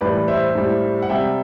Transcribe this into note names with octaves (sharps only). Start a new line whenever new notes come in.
A2 E3 G3 B4 D5
C5 E5
A2 G3
F#5
C3 G3 E5 G5